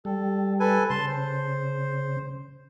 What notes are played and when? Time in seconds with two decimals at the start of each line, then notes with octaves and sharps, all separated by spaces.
0.05 G3 A4
0.60 A4 B4 G#5
0.90 C#3 A5 C6
1.08 C5